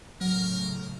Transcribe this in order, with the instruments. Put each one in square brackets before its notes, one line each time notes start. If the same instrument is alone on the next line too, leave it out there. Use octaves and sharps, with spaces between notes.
[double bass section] A2 C#3 A3 [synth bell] F#3 [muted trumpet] A#4